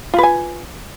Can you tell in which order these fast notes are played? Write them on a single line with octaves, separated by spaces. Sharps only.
F4 B4 G#5